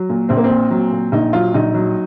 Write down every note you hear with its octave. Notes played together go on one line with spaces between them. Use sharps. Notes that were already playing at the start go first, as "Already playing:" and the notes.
Already playing: F#3
A#2
A#1 C4
A#3
C4
A#2
F#3
A#2
A#1 D#4
F#3 F4
A#1 D#4
F#3